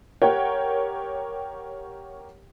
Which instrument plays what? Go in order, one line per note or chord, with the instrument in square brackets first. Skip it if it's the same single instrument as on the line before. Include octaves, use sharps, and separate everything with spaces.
[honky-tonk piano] G4 A#4 C#5 F#5 G5